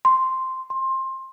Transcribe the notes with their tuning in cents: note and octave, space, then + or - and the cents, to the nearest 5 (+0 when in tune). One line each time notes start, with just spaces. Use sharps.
C6 -5
C6 +20